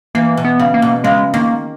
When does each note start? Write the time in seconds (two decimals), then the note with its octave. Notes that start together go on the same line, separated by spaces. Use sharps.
0.15 E3 A#3
0.37 B2
0.45 B3
0.59 C#3
0.74 A#3
0.82 B2
1.04 C#3 G#3
1.34 D#3 A#3